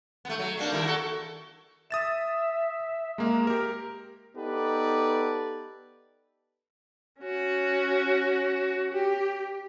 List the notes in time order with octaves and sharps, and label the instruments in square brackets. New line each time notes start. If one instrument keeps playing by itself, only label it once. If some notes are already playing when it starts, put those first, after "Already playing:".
[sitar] A3 B3
F#3
G3 A#3 D4
D#2 E4 A#4
F#4 A4
[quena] E5 [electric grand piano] D#6 A6 E7
[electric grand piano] G#3 A#3 [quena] A#5
[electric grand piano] G4 A#4
[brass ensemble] B3 D#4 G4 A4 B4 D5
[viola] C#4 F#4
G4